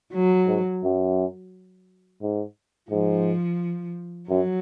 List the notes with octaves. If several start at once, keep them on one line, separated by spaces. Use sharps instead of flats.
F#3
G#2
F#2
G#2
G#2 F3
F#2 F#3